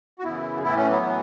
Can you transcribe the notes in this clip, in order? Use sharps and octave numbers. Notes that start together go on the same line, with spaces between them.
F#4
F#2 C#3 E3 B3 E4
A2 E3 B3 E4
A3 C#4
F#3 B3
A2 E3